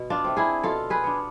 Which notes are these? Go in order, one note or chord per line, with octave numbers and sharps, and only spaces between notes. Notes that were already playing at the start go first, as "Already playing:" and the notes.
Already playing: B2
D4 F4
A3 C4
E4 G#4
B2 F4 A4
G#4 B4
B3 D4